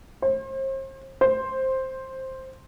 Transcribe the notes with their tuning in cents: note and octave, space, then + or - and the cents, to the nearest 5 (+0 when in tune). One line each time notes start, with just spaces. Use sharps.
C5 +40
C5 +10